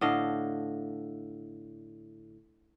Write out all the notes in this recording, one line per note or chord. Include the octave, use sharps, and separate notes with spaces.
A2 D3 D#5 F5